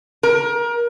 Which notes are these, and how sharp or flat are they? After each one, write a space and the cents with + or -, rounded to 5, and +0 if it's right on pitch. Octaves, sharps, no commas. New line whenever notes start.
A#4 +25